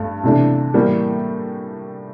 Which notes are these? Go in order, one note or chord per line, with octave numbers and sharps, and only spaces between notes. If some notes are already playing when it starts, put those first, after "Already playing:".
Already playing: G2 A3
C3 E3 A3 D4
A2 E3 G3 A#3